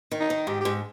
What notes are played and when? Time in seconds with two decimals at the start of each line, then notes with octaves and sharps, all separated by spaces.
0.11 D#3
0.20 D#4
0.30 D#3
0.47 G#2 G4
0.61 G#2 G4